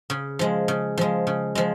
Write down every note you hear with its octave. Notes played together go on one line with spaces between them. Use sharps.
C#3
F3 G#3
C#3
F3 G#3
C#3
F3 G#3